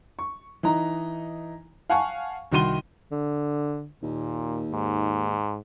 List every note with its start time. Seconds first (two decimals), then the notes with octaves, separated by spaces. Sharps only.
0.19 C#6
0.63 E3 D#4 A#5
1.90 F5 F#5 G#5 A5 C#6
2.52 C2 D#3 F#4 C6 D#7 G7
3.11 D3
4.03 D#2 A#2
4.71 G#2